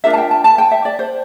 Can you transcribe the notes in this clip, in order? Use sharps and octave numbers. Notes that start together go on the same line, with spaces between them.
D4 F4 A#4 E5
A5
G5
A5
A5
G5
E5
D5
C5